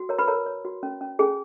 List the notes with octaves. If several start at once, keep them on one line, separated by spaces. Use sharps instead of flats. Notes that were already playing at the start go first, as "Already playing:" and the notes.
Already playing: F#4
A#4 C#5 A#5
B4 B5
A#4 C#5 A#5
C#5
F#4
C#4
C#4
C#4 G#4 G#5